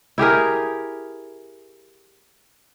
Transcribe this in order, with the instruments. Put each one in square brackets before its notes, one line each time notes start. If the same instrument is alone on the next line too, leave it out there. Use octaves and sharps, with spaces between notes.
[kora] E4 G4 G#4 A#4